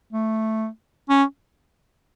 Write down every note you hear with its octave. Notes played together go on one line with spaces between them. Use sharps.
A3
C#4